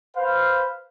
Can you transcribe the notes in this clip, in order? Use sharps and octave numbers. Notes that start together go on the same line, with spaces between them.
B4 C5 F5